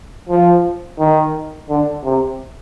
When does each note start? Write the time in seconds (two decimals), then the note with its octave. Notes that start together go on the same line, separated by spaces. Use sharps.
0.29 F3
0.99 D#3
1.69 D3
2.04 C3